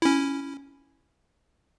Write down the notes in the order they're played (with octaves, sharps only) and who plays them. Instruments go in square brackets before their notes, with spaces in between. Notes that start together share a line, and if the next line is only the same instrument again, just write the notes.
[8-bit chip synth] C#4 E4